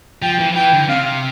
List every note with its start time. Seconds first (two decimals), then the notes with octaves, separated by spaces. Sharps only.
0.22 F3 G5
0.39 E3
0.52 F3
0.56 E3 G5
0.72 D3
0.88 C3 F5